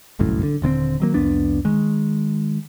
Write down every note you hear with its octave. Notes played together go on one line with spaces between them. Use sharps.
G1 C2 F#2 A2
D3
D#1 D3 B3 C4
D#3 F#3 A#3
C2 F2 B3 D4
D#3 G#3